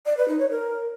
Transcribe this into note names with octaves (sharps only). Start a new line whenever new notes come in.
D5
B4
D#4
C#5
A#4